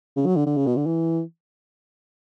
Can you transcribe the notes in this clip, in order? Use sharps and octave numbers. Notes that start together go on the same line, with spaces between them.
C#3
F#3
D3
D3
C#3
B2
D3
E3